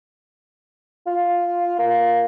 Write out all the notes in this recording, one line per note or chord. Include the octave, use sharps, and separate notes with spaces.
F4
A#3